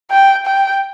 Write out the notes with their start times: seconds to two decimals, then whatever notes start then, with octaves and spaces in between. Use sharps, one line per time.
0.11 G5
0.46 G5